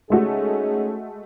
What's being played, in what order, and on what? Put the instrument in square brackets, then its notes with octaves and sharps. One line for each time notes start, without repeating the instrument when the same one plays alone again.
[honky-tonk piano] G#3 A3 F#4 [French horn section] C#4 D#4 G#4